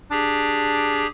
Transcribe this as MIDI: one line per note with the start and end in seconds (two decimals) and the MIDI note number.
0.11 1.06 62
0.11 1.07 67
0.11 1.07 68